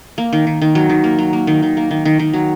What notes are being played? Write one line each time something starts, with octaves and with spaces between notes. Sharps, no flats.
A#3
D#3
D#3
D#3
F#3
D#3
A#3
F#3
A#3
D#3
D#3
A#3
D#3
D#3
D#3
F#3